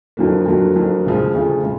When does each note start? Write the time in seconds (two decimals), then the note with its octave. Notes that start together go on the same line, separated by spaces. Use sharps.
0.17 F2 D3 F#3 A#3
0.46 F2 D3 F#3 A#3
0.75 F2 D3 F#3 A#3
1.05 D2 C#3 F3 G#3
1.34 D2 C#3 F3 G#3
1.63 C#3 G#3